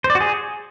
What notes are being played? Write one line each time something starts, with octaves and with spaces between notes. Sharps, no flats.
C5
D5
F#4
G#4